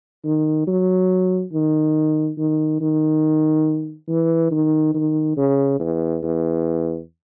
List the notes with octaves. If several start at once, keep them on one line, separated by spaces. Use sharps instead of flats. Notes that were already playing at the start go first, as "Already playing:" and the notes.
D#3
F#3
D#3
D#3
D#3
E3
D#3
D#3
C#3
E2
E2